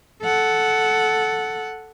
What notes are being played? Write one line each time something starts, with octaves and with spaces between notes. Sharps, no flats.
A4 F#5